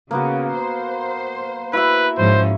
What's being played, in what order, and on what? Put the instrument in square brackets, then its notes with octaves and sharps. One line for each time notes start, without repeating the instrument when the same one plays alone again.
[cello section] C#3 [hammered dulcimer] A#3 B3 F#4
[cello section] C5
[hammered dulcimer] E4 F#4 E5 [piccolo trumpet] B4
[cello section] G#2 F3 C#4 [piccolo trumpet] C5